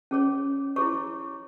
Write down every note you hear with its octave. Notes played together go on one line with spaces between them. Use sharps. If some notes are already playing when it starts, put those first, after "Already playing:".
C#4 G#4 C#5
E4 G#4 C#5 C#6